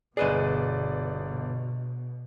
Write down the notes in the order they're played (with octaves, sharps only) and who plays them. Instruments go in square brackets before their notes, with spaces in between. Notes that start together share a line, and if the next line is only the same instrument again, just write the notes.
[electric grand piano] G1 D5 [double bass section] B2 [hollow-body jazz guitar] G#4 B4 D#5